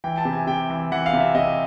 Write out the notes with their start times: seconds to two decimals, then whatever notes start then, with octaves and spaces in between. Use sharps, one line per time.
0.04 E3 G5
0.18 A5
0.25 C3
0.33 G#5
0.47 C3 G5
0.70 E3
0.92 E3 F#5
1.06 F5
1.13 C3
1.20 E5
1.35 C3 D#5